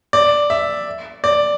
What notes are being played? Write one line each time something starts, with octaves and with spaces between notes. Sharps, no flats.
D5
E5
D5